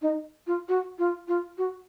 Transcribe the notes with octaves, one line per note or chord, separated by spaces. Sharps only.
D#4
F4
F#4
F4
F4
F#4